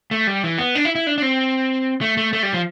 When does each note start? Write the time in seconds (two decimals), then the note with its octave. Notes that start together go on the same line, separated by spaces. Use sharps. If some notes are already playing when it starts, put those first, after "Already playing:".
0.11 A3
0.27 G3
0.43 E3
0.59 B3
0.75 D4
0.85 E4
0.95 E4
1.07 D4
1.18 D4
1.22 C4
2.01 A3
2.17 A3
2.33 A3
2.43 G3
2.54 F3